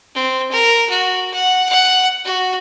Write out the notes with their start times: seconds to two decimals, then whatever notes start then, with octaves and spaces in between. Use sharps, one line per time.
0.15 C4
0.52 A#4
0.90 F#4
1.33 F#5
1.69 F#5
2.25 F#4